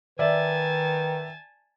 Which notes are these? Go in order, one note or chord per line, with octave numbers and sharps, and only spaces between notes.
D#3 B4 D5 E5 G#5 A5